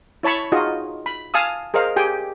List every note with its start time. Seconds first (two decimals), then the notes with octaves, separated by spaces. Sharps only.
0.23 E4 C#5 A5 B5 C#6
0.52 D#4 F4 F#4 G#4 D#5
1.06 B5
1.34 F5 G#5 A5 D#6 E6
1.74 G#4 A#4 C5 D#5 F5
1.96 G4 G#4 G5 G#5